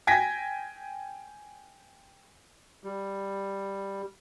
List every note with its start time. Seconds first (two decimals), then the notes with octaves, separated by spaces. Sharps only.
0.07 G5 G#5 G#6 A#6 B6
2.84 G3